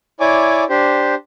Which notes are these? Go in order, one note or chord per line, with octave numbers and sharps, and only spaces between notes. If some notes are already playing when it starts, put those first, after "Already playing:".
E4 C#5 D5 G#5 D6
D4 G4 C5